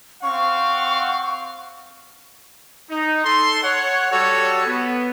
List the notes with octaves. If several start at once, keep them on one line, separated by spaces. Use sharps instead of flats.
C4 F5 F#5 C#6
D#4
A4 C6
C#5 F#5
G3 F#4 A4 C#5
B3